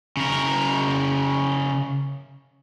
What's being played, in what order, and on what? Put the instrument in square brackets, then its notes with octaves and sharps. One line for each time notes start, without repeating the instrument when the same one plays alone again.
[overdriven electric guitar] C#3 A#4